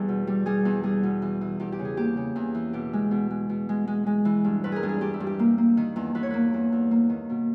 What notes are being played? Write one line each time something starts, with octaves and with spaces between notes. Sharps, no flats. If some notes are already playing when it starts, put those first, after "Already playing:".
Already playing: E2 G3 G#4
B2
G3
G3 G#4
E2
G3 G#4
B2
E3
E3
E2 G4
G4
C#3
G#4
A#3 G4
C#3
E2
E3
B2 G4
G#3
B2
G#3
B2
G#3
G#3
G#3
E3
G2
G2 B4
G#4 A#4
G2
G#4
G2 G4
E4
G2
G4
A#3
A#3
D#3
E2
E2 B4
C#5
A#3 B4
E2
E2
A#3
D#3
B2